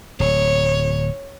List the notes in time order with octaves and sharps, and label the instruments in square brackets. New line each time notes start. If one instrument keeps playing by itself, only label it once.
[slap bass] D1 [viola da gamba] C#5